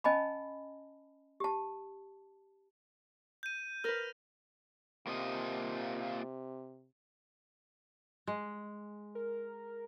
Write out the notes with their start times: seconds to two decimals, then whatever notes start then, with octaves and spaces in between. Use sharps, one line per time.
0.04 C#4 D#5 G#5 A5 B5
1.40 G4 A5
3.43 G6 D#7
3.84 A#4 B4 F6 A#6 F7
5.07 C3 A#3 F4 D#5
8.27 G#3
9.15 A#4